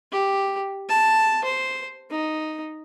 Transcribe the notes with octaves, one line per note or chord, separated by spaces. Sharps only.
G4
A5
C5
D#4